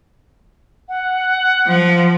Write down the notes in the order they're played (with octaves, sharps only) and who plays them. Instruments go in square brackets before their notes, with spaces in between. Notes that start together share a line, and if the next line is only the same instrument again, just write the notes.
[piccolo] F#5
[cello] F3